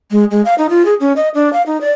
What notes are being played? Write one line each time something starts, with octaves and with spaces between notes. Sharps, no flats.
G#3
G#3
F5
D#4
F4
G#4
C#4
D#5
D4
F5
D#4
D5